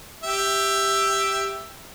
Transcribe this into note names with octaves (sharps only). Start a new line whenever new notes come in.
G4 E5